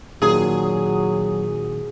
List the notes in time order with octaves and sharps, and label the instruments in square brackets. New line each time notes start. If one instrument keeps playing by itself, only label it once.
[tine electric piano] A#2 D#3 [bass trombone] F#3 [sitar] G#4